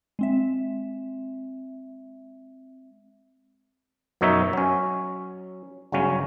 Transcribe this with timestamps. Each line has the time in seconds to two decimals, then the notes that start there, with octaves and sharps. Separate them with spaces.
0.19 G#3 C4 E5
4.21 F#2 B2 F#3 D#4 C#5 E5
4.53 F#3 C#4
5.92 G1 C#3 F#3 C#4